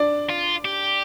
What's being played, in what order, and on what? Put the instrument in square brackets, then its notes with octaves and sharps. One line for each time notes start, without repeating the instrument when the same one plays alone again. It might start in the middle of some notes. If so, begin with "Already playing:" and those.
Already playing: [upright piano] D4 D5
[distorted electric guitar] F4
G4